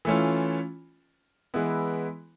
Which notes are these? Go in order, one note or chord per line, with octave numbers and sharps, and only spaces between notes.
E3 A3 C#4 F4
E3 G#3 B3 E4